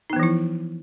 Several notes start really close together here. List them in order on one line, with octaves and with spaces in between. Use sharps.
D#4 B3 E3 F3 E4